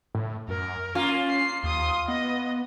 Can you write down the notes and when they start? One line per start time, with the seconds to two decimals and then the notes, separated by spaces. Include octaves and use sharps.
0.15 A2
0.48 F#2 A#4
0.95 A#3 C#4 F4
1.30 C7
1.63 D#2 C6 D#6
2.08 B3 D#5